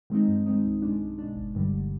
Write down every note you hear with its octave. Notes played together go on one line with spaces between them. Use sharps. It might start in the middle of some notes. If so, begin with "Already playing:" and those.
D#3 G#3 C4 D#4
G2
D#3 G#3 C4 D#4
B1
B2 G#3 D4
B1
B2 G#3 D4
G1
G2 D3 G3
G1